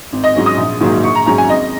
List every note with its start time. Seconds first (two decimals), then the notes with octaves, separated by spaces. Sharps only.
0.12 G#1
0.24 D#5
0.35 G#2 F#3 C#4
0.46 D#6
0.57 A#1
0.80 G#2 D#3 F#3 A#3
1.03 A#1 C#6
1.15 A#5
1.26 G#2 F#3 C#4 A#5
1.38 G#5
1.49 G#1 D#5